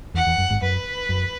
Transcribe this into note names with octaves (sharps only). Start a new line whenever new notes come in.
E2 F#5
E2
F#2
G#1 G#2
F#2 B4
F#2